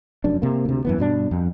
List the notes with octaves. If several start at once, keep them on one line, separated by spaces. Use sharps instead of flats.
F1 F#2 D4
C3 A#3
D2 C3
F#2 E3 B3
G2 B2 D4
F2